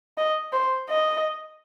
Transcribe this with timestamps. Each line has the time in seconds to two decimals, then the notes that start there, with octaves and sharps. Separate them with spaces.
0.18 D#5
0.52 C5
0.89 D#5